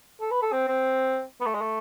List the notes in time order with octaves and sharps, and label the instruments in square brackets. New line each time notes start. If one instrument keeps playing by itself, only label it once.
[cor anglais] A4
B4
A4
C4
C4
B3
A3
G#3
A3